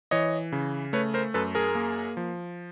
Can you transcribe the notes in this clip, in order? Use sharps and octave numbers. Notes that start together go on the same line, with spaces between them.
E3 C#5 D#5
C#3
A3 B4 C#5
A#4 C5
F#2 A4 B4
G#4 A#4
A#3
F3